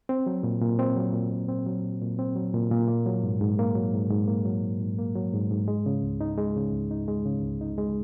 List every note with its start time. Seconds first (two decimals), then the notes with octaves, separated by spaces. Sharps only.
0.09 C4
0.26 F#3
0.43 A#2
0.61 A#2
0.79 C4
0.96 F#3
1.13 A#2
1.32 A#2
1.48 C4
1.66 F#3
1.84 A#2
2.01 A#2
2.19 C4
2.35 F#3
2.54 A#2
2.71 A#2
2.88 A#3
3.06 F#3
3.24 G#2
3.41 G#2
3.59 A#3
3.75 F#3
3.94 G#2
4.10 G#2
4.28 A#3
4.45 F#3
4.63 G#2
4.81 G#2
4.98 A#3
5.15 F#3
5.33 G#2
5.51 G#2
5.68 G#3
5.86 C#3
6.02 C#2
6.21 D#4
6.38 G#3
6.56 C#3
6.72 C#2
6.91 D#4
7.08 G#3
7.26 C#3
7.43 C#2
7.61 D#4
7.78 G#3